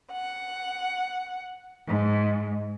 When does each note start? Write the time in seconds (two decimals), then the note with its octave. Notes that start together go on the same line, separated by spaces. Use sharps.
0.12 F#5
1.87 G#2